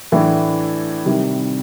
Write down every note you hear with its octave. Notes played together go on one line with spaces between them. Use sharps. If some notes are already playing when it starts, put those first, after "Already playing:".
A2 E3 A3 D4
C3 D#3 G3